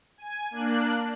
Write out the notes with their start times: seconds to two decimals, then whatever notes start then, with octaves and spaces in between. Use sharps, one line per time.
0.18 G#5
0.51 A#3 D4 F#6